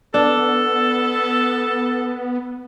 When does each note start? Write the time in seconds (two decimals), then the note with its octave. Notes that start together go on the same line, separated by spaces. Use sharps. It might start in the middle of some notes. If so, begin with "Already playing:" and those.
0.14 B3 D4 A4